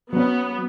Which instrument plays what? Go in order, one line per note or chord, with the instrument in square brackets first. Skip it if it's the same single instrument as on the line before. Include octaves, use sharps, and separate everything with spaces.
[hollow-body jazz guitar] F#3 C#4 [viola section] B3